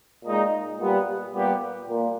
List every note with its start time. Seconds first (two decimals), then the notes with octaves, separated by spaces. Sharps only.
0.24 A#2 G#3 D#4
0.79 A#2 G3 B3 G4
1.34 A#2 G3 B3 G4
1.88 A#2 A#3